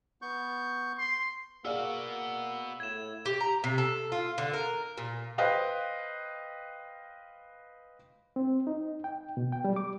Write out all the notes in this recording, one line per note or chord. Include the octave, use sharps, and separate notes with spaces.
B3 C#6 G6
C6
A#3 B3 F#4 G#4 D5 F5 E6
A2 G#6 E7
G4
A#5
C3
A4
F4
D3
A#4
A#2
B4 C5 D#5 F5 G5
C4
D#4
G5
B2
G5
G3
D6